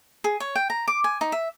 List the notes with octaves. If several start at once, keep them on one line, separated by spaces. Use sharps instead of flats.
G#4
C#5
G5
A#5
D6
G#5
D#4
E5